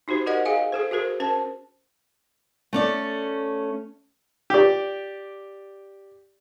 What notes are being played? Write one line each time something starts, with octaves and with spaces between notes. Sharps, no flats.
D#4 F#4 G4 C5
G4 A#4 C5 D5 D#5 F#5
G#4 D#5 F5 G#5
G#4 A4 C5
F#4 G#4 A#4 C5
C#4 A#4 C5 A5
A3 C#4 D5
G4 D5